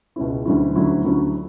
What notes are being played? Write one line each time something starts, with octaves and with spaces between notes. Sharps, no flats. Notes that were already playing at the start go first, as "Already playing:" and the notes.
C#2 B2 G#3 C#4 E4
D2 D3 F#3 C#4 E4
D2 D3 F#3 C#4 E4
D2 D3 F#3 C#4 E4